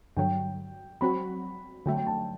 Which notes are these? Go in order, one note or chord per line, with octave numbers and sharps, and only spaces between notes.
G2 D3 F#3 G5
F#3 C4 F#4 B5
D3 F#3 A3 G5
G5
A5